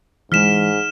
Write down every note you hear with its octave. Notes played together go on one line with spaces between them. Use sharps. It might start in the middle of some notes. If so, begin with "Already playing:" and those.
G#2 E3 G#3 F6 B6 E7